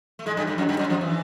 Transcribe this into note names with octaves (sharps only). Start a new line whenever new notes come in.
A3
G#2 G#3
G2 G3
G2 G3
F#2 F#3
G2 G3
F#2 F#3
F2 F3
E3